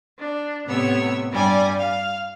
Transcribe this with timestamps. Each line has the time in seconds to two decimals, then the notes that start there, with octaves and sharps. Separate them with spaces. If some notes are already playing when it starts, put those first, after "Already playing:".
0.18 D4
0.67 A2 C3 B3 C#5 E6
1.32 G2 G3 D5 G#5
1.78 F5